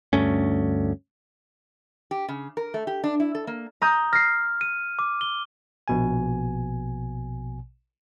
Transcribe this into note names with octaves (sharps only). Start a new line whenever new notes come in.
D2 G2 A3 C#4
G4
C#3
A#4
A3
G4
D4
E4
A4
A#3
A#5 D#6 G6
F6 A#6 C7
D#7
D6
G7
A#1 B2 G#5